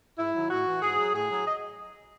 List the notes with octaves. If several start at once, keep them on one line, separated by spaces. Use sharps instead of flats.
G#2 E4
D#3 F#3
A2 F#4
E3
G#2 G#4
F#3
A2 G#4
F#3
D#5